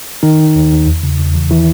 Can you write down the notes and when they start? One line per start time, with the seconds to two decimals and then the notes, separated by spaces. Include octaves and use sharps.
0.23 D#3 D#4
0.40 D#3
0.55 D#2
0.71 D#2
0.87 E2
1.03 C#3
1.19 E2
1.35 E3
1.51 D#3 E3 E4